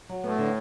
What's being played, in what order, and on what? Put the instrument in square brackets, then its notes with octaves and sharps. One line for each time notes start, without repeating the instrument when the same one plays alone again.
[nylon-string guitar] F#3
[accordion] A2 [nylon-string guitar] B3
[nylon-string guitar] D3